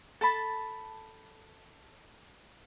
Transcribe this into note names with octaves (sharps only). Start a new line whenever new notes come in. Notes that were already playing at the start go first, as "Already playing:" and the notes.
A4 A5 B5